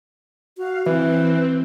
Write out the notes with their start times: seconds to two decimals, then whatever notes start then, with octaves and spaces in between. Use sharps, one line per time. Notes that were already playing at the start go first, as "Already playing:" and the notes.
0.58 F#4 F5
0.86 E3 C4 B4